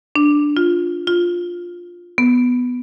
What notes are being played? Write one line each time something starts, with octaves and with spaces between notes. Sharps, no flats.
D4
F4
F4
B3